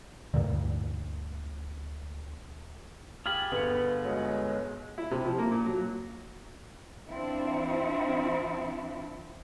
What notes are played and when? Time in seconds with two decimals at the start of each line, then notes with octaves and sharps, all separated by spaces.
0.34 D2 G2 A#2 D3
3.26 F4 G4 G#4 B5 F6
3.52 G1 B3 C#7
4.05 F#3 G#3
4.98 E4
5.11 C3
5.25 F3
5.38 A#3
5.51 A#2
5.66 F#3
7.08 E3 C4 D4 E4 F4